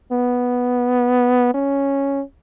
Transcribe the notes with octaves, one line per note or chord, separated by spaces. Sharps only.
B3
C#4